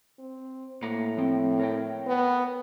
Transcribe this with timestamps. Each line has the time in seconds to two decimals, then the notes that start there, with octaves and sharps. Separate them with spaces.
0.19 C4
0.83 A2 A#3 F#5 A#5
1.17 F3 C4 G5
1.59 A#4 C#5 G5
2.06 B3